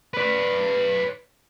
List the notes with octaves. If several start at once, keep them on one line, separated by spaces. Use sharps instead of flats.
B4 D5